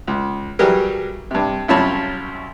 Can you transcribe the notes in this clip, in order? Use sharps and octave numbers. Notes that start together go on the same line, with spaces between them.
C#2
E3 F#3 G3 G4 G#4 A#4
G2 C3
C2 F#2 F4 C#5 A5 B5